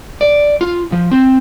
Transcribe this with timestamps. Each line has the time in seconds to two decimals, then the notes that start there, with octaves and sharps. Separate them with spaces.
0.21 D5
0.61 F4
0.92 F3
1.12 C4